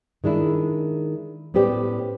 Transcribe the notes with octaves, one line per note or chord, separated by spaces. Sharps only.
D#3 G#3 D4 E4
A2 B3 C#4 G4 C5 D5